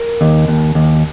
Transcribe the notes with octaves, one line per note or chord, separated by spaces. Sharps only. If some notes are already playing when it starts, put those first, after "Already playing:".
Already playing: A#4
D#2
D#2
D#2